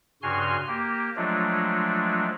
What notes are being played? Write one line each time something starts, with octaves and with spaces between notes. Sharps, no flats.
G2 C#3 F#4 G#5 C6 F6
A#3 G4
F3 F#3 G#3 A3 D4 F4